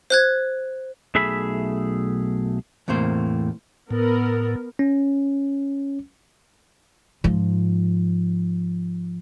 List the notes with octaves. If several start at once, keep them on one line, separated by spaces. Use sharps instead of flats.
C5 F#6 G#6
B1 A3 G#4 E5 B5
E2 A2 C3 A#3 C5
A2 B3 A#4
C#4
G#2 F3